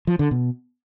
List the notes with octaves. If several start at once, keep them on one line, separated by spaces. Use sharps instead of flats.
F3
D3
B2